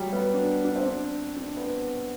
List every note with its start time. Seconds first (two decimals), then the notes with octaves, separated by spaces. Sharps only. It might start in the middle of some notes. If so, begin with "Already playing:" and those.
Already playing: F#3 G3
0.13 B3
0.34 D4
0.65 D4
0.76 C4
0.86 D4
1.36 D4
1.57 B3